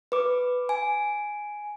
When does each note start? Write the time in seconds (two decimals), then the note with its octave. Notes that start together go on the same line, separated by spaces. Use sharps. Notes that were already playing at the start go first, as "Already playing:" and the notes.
0.12 B4 D6
0.69 G#5